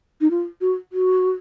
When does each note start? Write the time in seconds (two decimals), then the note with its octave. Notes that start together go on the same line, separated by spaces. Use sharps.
0.21 D#4
0.30 F4
0.61 F#4
0.92 F#4